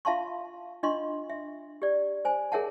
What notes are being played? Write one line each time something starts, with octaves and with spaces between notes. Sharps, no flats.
F4 E5 F5 A5 C6 C#6
D4 F4 D#5 C6 C#6
E5
G4 D5
C5 G#5
G#4 A#4 C#5 E5 F#5 A5